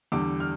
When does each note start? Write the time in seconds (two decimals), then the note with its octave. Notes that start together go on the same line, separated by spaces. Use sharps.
0.12 E2 D3 G3 D4 D6
0.40 F6